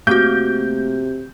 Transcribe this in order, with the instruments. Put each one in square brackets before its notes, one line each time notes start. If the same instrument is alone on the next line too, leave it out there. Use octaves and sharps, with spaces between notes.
[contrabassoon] C3 [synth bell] A3 A#3 F#4 [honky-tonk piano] G6